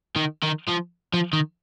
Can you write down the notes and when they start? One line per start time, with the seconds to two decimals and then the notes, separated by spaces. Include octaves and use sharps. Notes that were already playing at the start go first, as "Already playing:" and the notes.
0.16 D#3
0.43 D#3
0.68 F3
1.14 F3
1.33 D#3